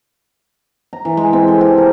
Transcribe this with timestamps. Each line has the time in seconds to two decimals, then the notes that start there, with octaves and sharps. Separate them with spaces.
0.93 A#5
1.05 E3
1.17 G#3
1.33 C4
1.48 A4
1.61 G4
1.78 A#4